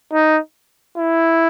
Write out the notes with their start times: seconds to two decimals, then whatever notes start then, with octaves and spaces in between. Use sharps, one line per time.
0.13 D#4
0.98 E4